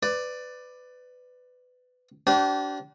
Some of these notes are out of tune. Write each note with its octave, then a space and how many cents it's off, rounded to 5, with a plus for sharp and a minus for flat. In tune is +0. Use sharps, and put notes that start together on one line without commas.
B4 +20 D5 +10
D4 -25 G4 -45 C5 -40